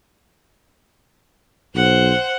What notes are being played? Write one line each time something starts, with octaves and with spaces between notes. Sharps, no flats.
B1 C5 F#5